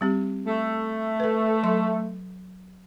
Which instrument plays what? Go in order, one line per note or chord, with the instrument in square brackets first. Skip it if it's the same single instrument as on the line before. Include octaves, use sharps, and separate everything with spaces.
[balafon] G3 C4 G4
[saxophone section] A3
[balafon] A4 B4
F#3 C6